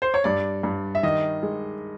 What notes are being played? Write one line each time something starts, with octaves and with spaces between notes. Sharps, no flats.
C5
C#5
G2 D5
G2
E5
D#3 D#5
G#3